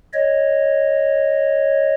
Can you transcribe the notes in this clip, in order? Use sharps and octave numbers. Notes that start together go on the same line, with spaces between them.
C#5 D#5